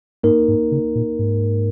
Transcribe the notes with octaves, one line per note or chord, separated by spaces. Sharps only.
G#2 A#3 D#4 A#4
G#2
C#3
A#2
G#2